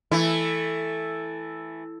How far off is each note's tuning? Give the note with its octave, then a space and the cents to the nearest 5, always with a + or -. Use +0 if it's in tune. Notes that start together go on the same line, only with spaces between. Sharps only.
E3 +0 A3 +0 E4 +0